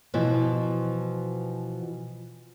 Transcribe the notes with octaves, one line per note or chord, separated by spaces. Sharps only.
B2 E3 F3